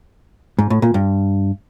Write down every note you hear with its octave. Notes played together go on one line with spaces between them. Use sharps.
G#2
A2
A#2
G2